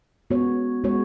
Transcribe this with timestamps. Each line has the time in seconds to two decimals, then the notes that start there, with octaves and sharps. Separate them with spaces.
0.30 G#3 B3 F#4 C#5
0.84 G#3 B3 F#4 C#5